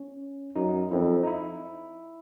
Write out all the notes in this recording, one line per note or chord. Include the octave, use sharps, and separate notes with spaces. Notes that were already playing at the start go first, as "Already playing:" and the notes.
Already playing: C#4
F#2 D#4
F2 E4
D#4
E4